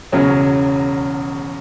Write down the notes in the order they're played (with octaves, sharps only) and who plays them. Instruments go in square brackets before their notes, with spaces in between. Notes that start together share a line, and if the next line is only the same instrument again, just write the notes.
[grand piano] E1 E2 C#3 F#3 C#4